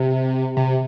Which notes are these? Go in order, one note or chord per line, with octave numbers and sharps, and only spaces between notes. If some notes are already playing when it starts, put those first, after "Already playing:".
Already playing: C3
C3